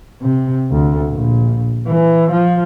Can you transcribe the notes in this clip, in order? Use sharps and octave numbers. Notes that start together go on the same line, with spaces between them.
C3
D2
A#1
E3
F3